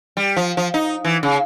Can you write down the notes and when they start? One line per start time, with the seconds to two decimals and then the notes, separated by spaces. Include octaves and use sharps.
0.17 G3
0.37 F3
0.57 F3
0.74 D#4
1.05 E3
1.23 C#3